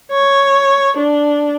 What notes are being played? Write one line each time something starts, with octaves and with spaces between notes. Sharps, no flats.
C#5
D4